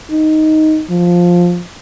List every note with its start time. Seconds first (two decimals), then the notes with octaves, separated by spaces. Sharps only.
0.10 D#4
0.90 F3